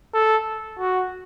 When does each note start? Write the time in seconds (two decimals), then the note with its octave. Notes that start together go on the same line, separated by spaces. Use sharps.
0.14 A4
0.79 F#4